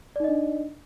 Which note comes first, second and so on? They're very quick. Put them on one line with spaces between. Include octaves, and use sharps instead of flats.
D5 D#4 D#5 D4